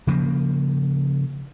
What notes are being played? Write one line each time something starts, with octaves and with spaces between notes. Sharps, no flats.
C#3 F3 A#3